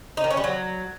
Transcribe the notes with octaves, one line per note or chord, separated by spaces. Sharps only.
D#4
D#3
C#4
G3
F#3